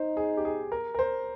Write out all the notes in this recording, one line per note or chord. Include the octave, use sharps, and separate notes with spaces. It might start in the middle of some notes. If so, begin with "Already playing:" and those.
Already playing: D#4 C5
G#4
G4
G#4
A#4
A#4
C5